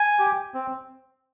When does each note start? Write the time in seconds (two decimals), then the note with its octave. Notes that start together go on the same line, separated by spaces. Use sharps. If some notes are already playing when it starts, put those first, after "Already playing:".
Already playing: G#5
0.19 G4
0.54 C4